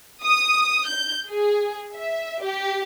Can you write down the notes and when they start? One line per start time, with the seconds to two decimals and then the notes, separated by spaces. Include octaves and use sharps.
0.23 D#6
0.88 G6
1.29 G#4
1.96 E5
2.43 G4